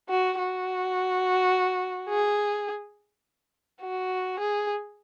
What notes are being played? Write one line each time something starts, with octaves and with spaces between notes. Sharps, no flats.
F#4
F#4
G#4
F#4
G#4